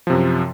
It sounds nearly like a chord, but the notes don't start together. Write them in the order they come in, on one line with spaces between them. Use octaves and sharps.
F3 C3 F#2